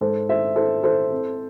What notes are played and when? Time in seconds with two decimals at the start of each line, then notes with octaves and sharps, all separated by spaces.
0.01 G#2 A4 C5
0.29 E4 C5 E5
0.56 E4 A4 C5
0.83 E4 A4 C5
1.12 C4